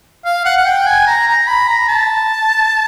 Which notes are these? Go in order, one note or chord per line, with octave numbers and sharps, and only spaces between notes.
F5
F#5
F#5
G5
G#5
A#5
A#5
B5
A#5
A5